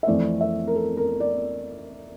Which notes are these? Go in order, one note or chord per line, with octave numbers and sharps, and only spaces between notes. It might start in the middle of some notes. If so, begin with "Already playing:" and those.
E5
F2 E3 A3 C4 D5
E5
A#4
A4
A#4
D5